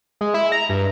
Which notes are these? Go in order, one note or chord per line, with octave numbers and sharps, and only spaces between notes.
G#3
E4
A#5
G2